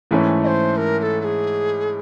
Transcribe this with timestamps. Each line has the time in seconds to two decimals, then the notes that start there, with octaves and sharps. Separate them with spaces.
0.11 G#2 E3 A3 C#4
0.43 D#5
0.47 C5
0.77 A#4
0.99 A#4
1.03 A4
1.21 A4
1.24 G#4